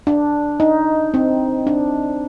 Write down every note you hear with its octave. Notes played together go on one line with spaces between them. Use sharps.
D4
D#4
C4
D4